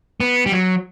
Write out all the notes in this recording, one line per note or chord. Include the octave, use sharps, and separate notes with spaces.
B3
G3
F#3